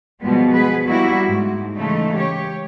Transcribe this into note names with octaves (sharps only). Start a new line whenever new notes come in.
B2 F3 G3 G#3 B3
B3 G#4 B4
G3 A#3 E4 F#4
G#2
C#3 E3 G#3 A3 D#4
G4 C#5